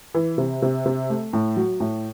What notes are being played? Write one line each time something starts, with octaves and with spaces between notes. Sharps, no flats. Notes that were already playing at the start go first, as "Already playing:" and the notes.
E3
C3
C3
C3
A3
A2
F#3
A2